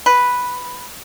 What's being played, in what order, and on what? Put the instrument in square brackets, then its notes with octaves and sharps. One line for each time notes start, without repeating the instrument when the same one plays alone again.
[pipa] B4